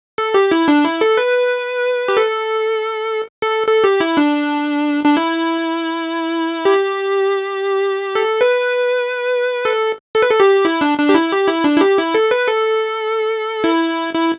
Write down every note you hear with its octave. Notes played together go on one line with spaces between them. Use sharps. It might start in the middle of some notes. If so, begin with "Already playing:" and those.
A4
G4
E4
D4
E4
A4
B4
G4
A4
A4
A4
G4
E4
D4
D4
E4
G4
A4
B4
A4
A4
B4
A4
G4
E4
D4
D4
G4
E4
G4
E4
D4
E4
G4
E4
A4
B4
A4
E4
E4